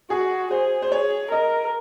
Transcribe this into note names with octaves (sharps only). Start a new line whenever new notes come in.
F#4 G#4
G#4 C5
C5
G#4 C#5
A#4 D#5